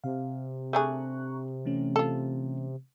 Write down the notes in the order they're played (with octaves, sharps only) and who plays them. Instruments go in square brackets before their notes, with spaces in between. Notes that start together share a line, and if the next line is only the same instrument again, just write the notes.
[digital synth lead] C3 [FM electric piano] F5
[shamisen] A3 D4 G#4 [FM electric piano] A#5 C#6 F#6
[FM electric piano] E3 A3 C#4
[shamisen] F4 A4